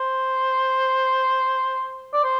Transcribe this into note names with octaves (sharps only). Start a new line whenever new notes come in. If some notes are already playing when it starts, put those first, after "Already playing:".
Already playing: C5
D5
C5